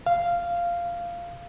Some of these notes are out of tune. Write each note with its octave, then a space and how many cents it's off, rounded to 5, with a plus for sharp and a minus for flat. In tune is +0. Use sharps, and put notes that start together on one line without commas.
F5 -10